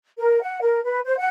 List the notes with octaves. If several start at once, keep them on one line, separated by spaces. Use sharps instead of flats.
A#4
F#5
A#4
B4
C5
F#5